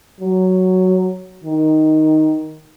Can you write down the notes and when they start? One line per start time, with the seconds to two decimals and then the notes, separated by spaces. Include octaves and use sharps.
0.20 F#3
1.44 D#3